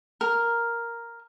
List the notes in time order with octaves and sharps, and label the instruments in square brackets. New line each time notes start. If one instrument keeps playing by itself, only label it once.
[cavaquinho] A#4